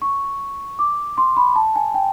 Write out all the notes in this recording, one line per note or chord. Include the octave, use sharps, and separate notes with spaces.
C#6
D6
C6
B5
A5
G#5
G5